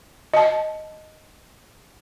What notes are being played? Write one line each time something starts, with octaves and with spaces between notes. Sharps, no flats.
D#5 A5